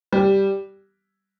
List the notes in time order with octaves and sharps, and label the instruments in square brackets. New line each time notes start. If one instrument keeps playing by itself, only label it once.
[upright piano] G3